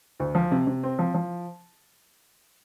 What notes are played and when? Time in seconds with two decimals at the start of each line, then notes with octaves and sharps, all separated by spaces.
0.20 D2
0.35 F3
0.51 C3
0.67 C3
0.83 C4
0.99 F3
1.14 F3